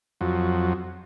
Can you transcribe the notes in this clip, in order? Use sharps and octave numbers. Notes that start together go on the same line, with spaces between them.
F2 F#3